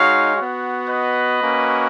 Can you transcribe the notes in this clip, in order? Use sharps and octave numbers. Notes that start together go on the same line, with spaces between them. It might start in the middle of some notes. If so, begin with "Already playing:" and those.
Already playing: G#3 D#4 F#4 C#5 F5
B3 F#4
B4 D#5
A#3 C#4 F#4